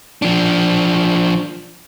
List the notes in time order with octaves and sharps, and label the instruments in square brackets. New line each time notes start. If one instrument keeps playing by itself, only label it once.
[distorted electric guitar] F3 D4